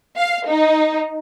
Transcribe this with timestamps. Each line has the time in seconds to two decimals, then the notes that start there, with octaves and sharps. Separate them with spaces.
0.17 F5
0.49 D#4